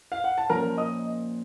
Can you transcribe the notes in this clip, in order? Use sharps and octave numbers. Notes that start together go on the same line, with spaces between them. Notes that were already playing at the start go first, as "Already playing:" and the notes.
F5
F#5
A5
A#2 F3 A#3 C#4 F4 A#4 A#5
D#5 D#6